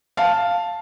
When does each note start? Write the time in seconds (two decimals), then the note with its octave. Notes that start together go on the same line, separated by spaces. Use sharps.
0.17 F5 A5